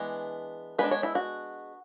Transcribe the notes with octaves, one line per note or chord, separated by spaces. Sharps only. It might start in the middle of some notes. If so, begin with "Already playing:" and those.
Already playing: E3 G#3 B3 D4 B4
G#3 B3 D4 B4
C#5
E4
F#4